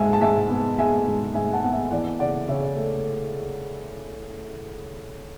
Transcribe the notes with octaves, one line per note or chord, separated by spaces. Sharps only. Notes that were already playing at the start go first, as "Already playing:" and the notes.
Already playing: G#2 G#3 E5 G#5 A5
A5
G#2 E5 G#5
B3
G#3 E5 G#5
G#2
G#2 E5 G#5
F#5 A5
B3 F#5
E5 G#5
E3 D5 F#5
C#3 D5 F#5
C#3 C#5 E5
A3